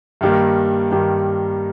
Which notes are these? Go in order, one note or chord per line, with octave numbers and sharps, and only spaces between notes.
G2 D#3 G3 A#3
G2 D#3 G3 A#3